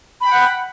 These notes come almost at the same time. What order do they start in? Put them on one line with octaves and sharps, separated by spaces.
B5 G5 F#5